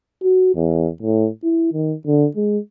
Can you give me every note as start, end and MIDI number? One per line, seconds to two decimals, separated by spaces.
0.23 0.51 66
0.55 0.88 40
1.02 1.29 45
1.43 1.73 64
1.73 1.94 51
2.06 2.26 50
2.36 2.58 56